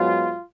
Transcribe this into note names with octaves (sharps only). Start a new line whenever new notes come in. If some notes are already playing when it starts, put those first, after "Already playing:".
Already playing: G#2 F#3 B3 F4